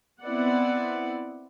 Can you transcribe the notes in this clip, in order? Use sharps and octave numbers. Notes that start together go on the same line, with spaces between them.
B3 C4 E4 D5 F#5